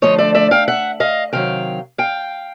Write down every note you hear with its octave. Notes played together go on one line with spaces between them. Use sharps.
D2 C#3 F3 A3 C#5 D#5
D5 E5
D5 E5
F5 G5
E5 F#5
D#5 F5
C3 D#3 F#3 F5 G5
F5 G5